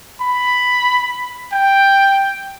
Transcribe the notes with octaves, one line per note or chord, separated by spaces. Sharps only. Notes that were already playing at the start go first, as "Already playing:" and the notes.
B5
G5